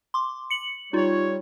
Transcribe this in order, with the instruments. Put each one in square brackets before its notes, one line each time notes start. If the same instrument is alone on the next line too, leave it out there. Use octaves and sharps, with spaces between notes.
[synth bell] C6 D6
C#7 F#7
[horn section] G3 C#5 [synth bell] D#4 F4